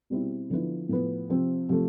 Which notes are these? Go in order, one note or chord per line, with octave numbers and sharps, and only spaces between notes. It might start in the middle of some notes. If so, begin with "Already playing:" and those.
B2 G3 C4 E4
D3 F3 B3 E4
A2 F3 B3
C3 F3 C4
C3 F3 A3